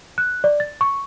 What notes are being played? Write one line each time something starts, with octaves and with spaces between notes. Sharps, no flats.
F#6
D5
A6
C#6